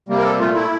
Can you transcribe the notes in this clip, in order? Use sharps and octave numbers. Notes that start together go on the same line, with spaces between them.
C3 G3 A#3
A#4
A4
A#2 A3 F4
E4